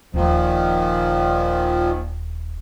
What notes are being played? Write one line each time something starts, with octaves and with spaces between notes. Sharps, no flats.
D#1 A#2 D#3 F3